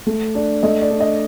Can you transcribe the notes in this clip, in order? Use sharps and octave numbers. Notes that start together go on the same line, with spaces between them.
A3
D4 D5
A3 D#5
D5
D4
D#5